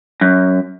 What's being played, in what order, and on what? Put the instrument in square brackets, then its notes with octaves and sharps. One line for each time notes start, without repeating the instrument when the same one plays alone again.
[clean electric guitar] F#2